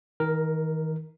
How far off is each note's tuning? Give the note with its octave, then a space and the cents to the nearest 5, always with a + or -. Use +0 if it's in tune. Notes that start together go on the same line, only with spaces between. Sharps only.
D#3 +35 A#4 +0